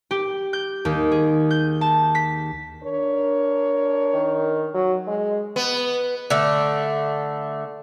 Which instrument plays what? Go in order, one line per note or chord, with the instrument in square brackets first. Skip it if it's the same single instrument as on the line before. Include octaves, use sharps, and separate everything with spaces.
[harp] G4
G6
D#2
G#4
G6
A5
B6
[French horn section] D4 A#4 C#5
[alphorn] D#3
F#3
G#3
[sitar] B3
[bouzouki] D3 A3